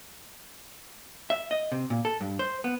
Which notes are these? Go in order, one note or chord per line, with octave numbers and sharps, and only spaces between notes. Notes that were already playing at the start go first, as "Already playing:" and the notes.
E5
D#5
C3
A#2
A4
G2
C5
B3